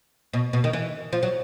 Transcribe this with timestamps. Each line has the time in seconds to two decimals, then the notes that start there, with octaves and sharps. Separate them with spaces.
0.33 B2
0.53 B2
0.64 D#3
0.73 E3
1.13 F3
1.23 F#3